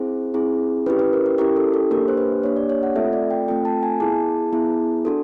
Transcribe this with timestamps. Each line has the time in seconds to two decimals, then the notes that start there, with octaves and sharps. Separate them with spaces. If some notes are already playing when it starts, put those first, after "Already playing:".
Already playing: C4 E4 G#4 C5
0.34 C4 E4 G#4
0.86 C#4 E4 G4 B4
0.99 B4
1.13 A#4
1.26 A#4
1.38 C#4 E4 G4 A#4
1.56 A4
1.74 A4
1.91 A#3 D4 G4 A#4
2.08 C5
2.17 B4
2.43 A#3 D4 G4 C#5
2.56 D5
2.70 C#5
2.83 F#5
2.95 A3 C4 F4 A4 E5
3.13 D5
3.31 G5
3.48 A3 C4 F4 A4 G5
3.65 A5
3.83 G#5
4.00 B3 E4 G#4 A5
4.53 B3 E4 G#4
5.05 D4 F#4 A4